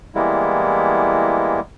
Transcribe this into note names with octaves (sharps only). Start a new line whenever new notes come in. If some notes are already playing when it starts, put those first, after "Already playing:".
E3 G3 G#3 A#3 B3 E4